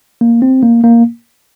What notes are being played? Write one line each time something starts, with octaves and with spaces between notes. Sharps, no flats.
A#3
C4
A#3
A#3